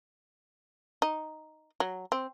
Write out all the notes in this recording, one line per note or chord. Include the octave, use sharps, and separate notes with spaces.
D#4
F#3
C4